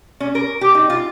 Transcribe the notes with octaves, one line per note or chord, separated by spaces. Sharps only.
C#4
A#4
G4
D#4
F4